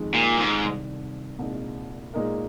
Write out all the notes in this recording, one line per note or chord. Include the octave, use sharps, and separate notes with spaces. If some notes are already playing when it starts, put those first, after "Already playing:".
Already playing: F2 D#3 G#3
A#2
G#2
C2 C3 D#3 G3
C2 A#2 G#3 D#4
A#2 G#3 D#4 A#4